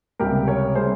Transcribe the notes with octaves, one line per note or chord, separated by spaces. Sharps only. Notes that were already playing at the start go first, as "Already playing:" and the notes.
C#2 C3 G3 G4 A#4
A#4 C#5
C3 G3 G#4 C5